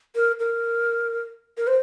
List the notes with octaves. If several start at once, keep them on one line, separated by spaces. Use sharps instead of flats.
A#4
A#4
A#4
C5